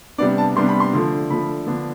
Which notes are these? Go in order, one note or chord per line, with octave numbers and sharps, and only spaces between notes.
C3 G3 B3 D4 D5
A5
C3 G3 B3 D4 C6
B5
C6
D3 F3 A3
D3 F3 A3 B5
D3 F3 B3 D4